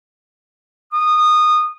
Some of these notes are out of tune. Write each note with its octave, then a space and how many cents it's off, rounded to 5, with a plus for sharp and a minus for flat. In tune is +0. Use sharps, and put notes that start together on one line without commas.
D#6 -20